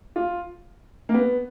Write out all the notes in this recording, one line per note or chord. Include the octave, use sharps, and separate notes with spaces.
F4
A#3
B3